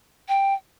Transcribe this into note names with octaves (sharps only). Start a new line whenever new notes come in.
G5